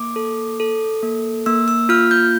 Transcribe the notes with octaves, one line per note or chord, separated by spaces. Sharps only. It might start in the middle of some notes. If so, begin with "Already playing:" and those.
Already playing: A#3 D6
A4
A4
A#3
A#3 E6
E6
F4 F6
G6